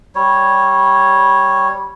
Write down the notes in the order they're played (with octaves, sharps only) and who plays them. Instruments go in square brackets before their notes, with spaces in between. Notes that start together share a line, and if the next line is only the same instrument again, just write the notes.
[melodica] G3 C#5